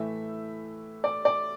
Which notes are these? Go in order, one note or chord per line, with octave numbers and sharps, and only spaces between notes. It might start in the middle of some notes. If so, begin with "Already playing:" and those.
Already playing: A2 E3 A3 E5
D5
D5